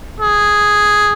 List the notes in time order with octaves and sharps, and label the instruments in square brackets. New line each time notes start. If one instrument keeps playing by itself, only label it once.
[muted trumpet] G#4